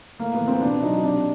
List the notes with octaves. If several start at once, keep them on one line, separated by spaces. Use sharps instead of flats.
A2 A#3
B3
E3
C4
B2 D4
F#3 D#4
C3 D4